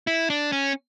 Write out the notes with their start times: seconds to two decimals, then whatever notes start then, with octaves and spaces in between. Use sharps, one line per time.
0.07 E4
0.30 D4
0.52 C#4